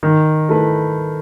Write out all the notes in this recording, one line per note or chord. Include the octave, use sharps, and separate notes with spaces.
D#3
A3 E4 B4